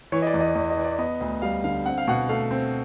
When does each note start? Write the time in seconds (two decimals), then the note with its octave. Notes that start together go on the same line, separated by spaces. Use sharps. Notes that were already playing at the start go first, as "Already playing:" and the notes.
0.12 E3 C#5
0.22 D#5
0.27 D5
0.34 E2
0.41 D#5
0.55 E2
0.70 D#5
0.77 E3
0.84 D5
0.99 B3 D#5
1.21 D2
1.42 G3 F5
1.64 D3 F5
1.86 C4 F#5
1.98 F5
2.07 B2 F#5
2.29 A3 F5
2.51 C4